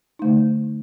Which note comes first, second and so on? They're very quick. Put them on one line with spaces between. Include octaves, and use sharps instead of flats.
D#4 A3 D3